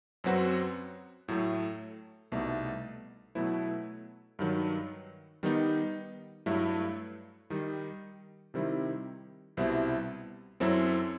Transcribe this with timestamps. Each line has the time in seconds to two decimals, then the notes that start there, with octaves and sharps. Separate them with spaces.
0.24 F#2 F#3 C4 F#4 B4
1.28 A2 F#3 A3
2.32 C2 B2 A3 D#4
3.35 B2 F#3 A3 E4 B4
4.39 G2 D#3 F#3
5.43 D#3 G3 B3 D#4
6.46 G2 F#3 A3 E4
7.50 D#3 G3 D#4
8.54 C3 D#3 G3 C4 E4
9.57 C2 B2 G3 C4 E4
10.60 F#2 F#3 C4 E4 A4